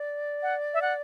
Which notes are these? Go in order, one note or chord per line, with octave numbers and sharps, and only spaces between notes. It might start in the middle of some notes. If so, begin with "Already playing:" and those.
Already playing: D5
F#5
E5
F#5